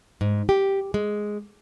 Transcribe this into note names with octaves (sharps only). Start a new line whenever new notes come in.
G#2
G4
G#3